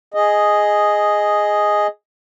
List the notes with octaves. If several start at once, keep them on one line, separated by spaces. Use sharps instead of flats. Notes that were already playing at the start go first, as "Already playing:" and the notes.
G#4 D#5